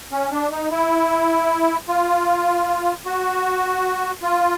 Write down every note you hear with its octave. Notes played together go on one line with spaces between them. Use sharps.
C#4
D4
D#4
E4
F4
F#4
F4